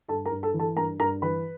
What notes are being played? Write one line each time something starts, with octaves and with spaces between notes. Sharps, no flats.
G2 A4 A5
A#4 A#5
G2
A4 A5
E3
A4 A5
G2 A#4 A#5
G2 A#4 A#5
E3 B4 B5